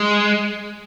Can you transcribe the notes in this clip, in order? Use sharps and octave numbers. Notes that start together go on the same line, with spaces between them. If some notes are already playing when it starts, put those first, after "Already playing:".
Already playing: G#3